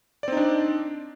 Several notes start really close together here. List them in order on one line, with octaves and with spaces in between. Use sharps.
D5 C4 D#4 D4